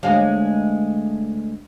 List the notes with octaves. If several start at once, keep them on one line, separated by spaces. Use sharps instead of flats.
D2 G#3 F5